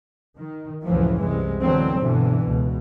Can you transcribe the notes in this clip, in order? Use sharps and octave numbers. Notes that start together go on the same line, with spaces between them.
D#3
C#2 F#2 A2 E3 F3
C2 C3 G#3
B2 D3 E3 F#3 C4
G2 B2 D3 E3
C#2 B2